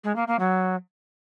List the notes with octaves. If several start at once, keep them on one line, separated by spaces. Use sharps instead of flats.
G#3
A#3
A#3
F#3